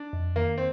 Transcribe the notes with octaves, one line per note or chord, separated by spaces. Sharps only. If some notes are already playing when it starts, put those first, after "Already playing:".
Already playing: D4
F2
D#3 A#3
C4